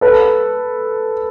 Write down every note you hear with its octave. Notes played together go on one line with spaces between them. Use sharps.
A4 B4